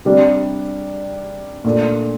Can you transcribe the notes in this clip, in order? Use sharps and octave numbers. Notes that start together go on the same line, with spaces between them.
C3 G3 D4
A#2 A3 D4